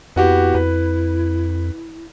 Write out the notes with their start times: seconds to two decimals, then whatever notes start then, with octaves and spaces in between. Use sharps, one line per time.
0.16 F2 B3 E4 F#4 G4
0.55 F2 B4